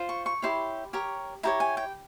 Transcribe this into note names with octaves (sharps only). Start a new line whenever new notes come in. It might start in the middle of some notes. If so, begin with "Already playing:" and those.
Already playing: F4 C5
C#6
C#6
E4 G4 C#5 C6
G4 A#4 C#5
E4 G4 C#5 A#5
G#5
G5